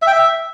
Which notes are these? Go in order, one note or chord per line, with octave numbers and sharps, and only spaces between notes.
E5
G5
E5